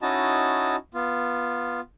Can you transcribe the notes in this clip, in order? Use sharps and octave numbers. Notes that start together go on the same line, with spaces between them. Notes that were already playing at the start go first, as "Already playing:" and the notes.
C#4 D#4 E4 F#4 D#5 A5
B3 F4